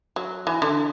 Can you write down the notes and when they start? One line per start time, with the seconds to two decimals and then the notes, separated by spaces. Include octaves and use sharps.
0.16 F#3
0.47 E3
0.62 D3